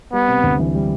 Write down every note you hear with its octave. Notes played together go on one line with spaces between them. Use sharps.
G3 B3
C3
D2
E3
G3